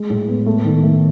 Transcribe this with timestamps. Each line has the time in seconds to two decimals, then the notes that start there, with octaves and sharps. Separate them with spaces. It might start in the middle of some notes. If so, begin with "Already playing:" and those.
Already playing: G#3
0.10 A2
0.28 B3
0.46 A3
0.65 D#3
0.83 A3